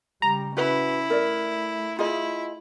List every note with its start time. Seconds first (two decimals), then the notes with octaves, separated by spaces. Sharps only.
0.22 C#3 G3 A#5
0.57 C#4 E4 F#4 B4
1.10 A3 A#4 D5
1.99 E4 F4 G#4 D#5